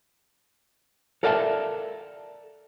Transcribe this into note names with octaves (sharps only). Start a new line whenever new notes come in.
A4 A#4 D5 E5 F5 A5